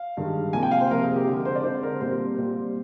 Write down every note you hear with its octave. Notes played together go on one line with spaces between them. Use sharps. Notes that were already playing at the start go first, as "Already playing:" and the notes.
Already playing: F5
G2 D#3 G#3
C3 F3 A#3 G#5
G5
F5
C5
C3 F3 A#3 A#4
G#4
G4
D3 G#3 C4
A#4
C5
D5
D3 G#3 C4 C5
A#4
A#2 G3 C4 C5
A#2 G3 C4